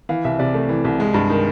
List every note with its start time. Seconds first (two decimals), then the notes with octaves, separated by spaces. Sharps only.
0.09 E3 F5
0.25 C2 E5
0.39 C3 D5
0.54 A3
0.69 E3
0.85 C2
1.00 G#3
1.14 G2
1.30 D#3